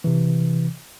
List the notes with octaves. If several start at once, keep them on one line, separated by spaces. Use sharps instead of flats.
C3 E3